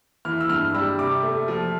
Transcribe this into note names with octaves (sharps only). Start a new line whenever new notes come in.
E3 F6
E6
G2 F6
G3 E6
C3 D6
A3
F3